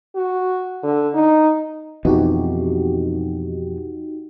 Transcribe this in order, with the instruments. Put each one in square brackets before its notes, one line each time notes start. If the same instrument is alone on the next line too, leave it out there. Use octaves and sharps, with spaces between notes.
[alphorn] F#4
D3
D#4
[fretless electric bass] F2 B2 E3 [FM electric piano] D#4 F#4 G4